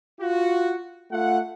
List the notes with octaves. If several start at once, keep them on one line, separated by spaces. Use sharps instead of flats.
F4 F#4
A3 F4 F#5